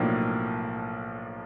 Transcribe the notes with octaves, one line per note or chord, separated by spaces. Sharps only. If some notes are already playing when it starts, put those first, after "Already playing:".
Already playing: B1 A2 F3 A#3 D4